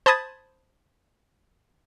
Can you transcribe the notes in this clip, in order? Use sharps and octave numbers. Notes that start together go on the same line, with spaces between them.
C5 A5 B5 D#6 G#6 A6